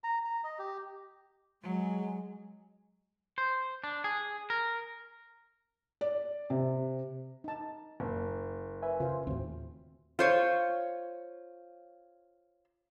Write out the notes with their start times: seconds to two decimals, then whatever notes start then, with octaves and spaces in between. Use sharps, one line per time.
0.04 A#5
0.25 A#5
0.44 D#5
0.59 G4
1.63 F#3 G#3
3.38 C5
3.84 D4
4.04 G#4
4.50 A#4
6.01 D5
6.50 C3
7.44 D#4 A5
8.00 F#1
8.82 B4 E5 G#5
9.00 C#3 F4 C5 F5
9.27 D#2 A2 C4 F#4 C5
10.19 F4 C5 C#5